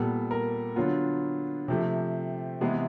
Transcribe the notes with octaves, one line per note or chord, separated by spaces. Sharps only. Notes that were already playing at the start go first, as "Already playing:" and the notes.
Already playing: A#2 G3 B3 A4
A#4
D3 F#3 B3 F4
C3 F3 A3 G4
C3 E3 G#3 B3 G#4